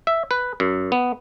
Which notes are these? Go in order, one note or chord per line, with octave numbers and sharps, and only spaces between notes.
E5
B4
F#2
B3